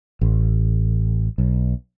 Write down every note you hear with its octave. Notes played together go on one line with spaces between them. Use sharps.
A1
B1